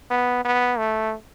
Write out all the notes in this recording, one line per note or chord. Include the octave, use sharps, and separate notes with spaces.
B3
B3
A3